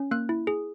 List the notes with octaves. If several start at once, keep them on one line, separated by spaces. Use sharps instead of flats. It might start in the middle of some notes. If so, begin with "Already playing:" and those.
Already playing: C#4
A#3 F#6
E4
G#4